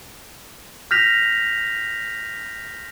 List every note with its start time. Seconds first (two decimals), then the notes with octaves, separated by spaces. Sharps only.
0.91 F6 G6 A#6 B6 F7